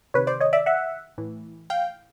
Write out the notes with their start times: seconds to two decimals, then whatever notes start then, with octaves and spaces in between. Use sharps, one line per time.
0.14 C3 D#3 B4 C#5
0.27 C5 D5
0.40 C#5 D#5
0.53 D5 E5
0.66 E5 F#5
1.18 A2 E3
1.70 F5 G5